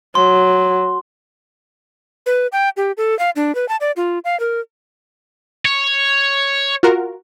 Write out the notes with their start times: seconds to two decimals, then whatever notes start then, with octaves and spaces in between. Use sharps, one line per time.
0.15 F#3 C6
2.26 B4
2.52 G5
2.77 G4
2.97 A4
3.19 F5
3.36 D4
3.55 B4
3.69 A5
3.81 D5
3.96 F4
4.25 F5
4.40 A#4
5.65 C#5
6.83 F4 F#4 A#4